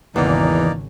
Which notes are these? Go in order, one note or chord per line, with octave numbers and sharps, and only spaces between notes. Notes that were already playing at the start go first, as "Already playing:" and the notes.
G#1 E2 C#3 E3 A#3 D#4 D5